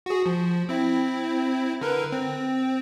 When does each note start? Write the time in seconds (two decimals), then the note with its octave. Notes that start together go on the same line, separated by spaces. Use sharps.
0.06 F#4 G#4
0.26 F3
0.69 C4 E4
1.81 D3 A#4 B4
2.12 C4